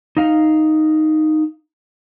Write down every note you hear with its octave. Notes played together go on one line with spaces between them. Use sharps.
D#4 F5